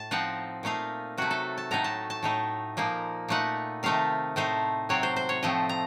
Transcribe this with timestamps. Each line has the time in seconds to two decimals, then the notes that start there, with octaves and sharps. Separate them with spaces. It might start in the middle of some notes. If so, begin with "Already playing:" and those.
Already playing: A2 A5
0.11 F3 C4 D#4 F#5
0.63 A#2 A3 D#4 F5
1.18 C3 F#3 A3 F#4
1.31 A4
1.58 A5
1.71 A2 F#3 A3 D#4 A#5
1.84 A5
2.10 A5
2.23 A2 A3 D#4
2.77 A#2 F3 A#3 D#4
3.28 A#2 A3 D#4 F#5
3.83 C3 D#3 A3 D#4 F5
4.36 A2 A3 D#4 C5
4.89 C3 F#3 C4 C#5
5.03 C5
5.16 C5
5.29 C#5
5.43 A2 F3 A3 C4 D#5
5.69 A#5